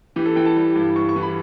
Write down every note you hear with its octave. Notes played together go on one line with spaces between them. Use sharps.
E3 G4
A4
E3 G5
A5
G3
G2
G2 C#6
C#6
E3
B5